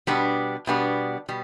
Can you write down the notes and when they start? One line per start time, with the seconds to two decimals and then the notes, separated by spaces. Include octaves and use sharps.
0.07 B2 G3 B3 D4
0.67 B2 G3 B3 D4
1.29 B2 G3